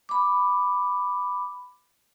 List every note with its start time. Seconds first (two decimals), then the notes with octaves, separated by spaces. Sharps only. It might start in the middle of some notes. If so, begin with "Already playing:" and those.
0.09 B5 D6